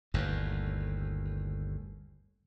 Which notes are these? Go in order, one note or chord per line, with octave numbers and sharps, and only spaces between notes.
G1 D#2 A2